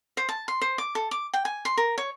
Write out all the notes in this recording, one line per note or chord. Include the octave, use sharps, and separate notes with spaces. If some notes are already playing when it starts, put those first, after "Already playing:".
C5
A5
C6
C5
D6
A4
D6
G5
G#5
C6
A#4
C#5